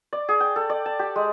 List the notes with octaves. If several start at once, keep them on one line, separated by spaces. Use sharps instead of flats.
D5
G#4
G5
A4
D5
A5
G4
G#3